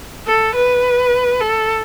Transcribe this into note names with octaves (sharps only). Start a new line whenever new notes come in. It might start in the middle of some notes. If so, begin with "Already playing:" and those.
A4
B4
A4